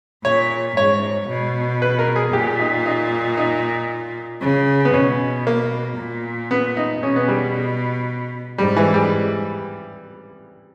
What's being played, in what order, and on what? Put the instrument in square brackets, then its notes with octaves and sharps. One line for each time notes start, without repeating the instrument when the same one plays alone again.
[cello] A#2 [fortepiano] C#5
[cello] G#2 [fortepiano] C#5
[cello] B2
[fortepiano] B4
A#4
G#4
[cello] A#2 [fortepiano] G4
[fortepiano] D#4
D#4
D#4
[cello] C#3
[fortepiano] B3
[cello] B2 [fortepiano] C#4
[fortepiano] A#3
[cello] A#2
[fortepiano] B3
D#4
[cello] B2 [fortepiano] C#4
[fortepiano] B3
G3
[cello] G#2 [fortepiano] G3
[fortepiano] E3
G3